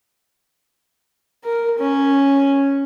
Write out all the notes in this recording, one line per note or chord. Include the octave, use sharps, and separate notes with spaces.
A#4
C#4